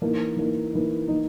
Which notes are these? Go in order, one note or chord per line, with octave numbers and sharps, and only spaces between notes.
E3 A#3 D#4
E3 A#3 D#4
E3 A#3 D#4
E3 A#3 D#4